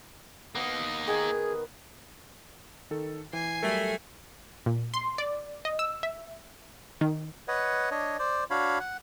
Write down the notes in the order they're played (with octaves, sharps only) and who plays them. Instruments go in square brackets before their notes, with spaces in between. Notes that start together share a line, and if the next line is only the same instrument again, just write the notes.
[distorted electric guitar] A#3 D#4 [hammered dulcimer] B3
[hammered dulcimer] D#3 [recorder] G#4
[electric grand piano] D#3 A4
[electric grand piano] E3 [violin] G#5 C7
[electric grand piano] F#3 G3 A#4 [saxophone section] A3
[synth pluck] A#2
C6
D5
D#5
E6
E5
D#3
[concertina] B4 C#5 D#5 F#5
D4 C#5 D#5
C5 D5
D4 F#4 C#5 F5 B5
F#5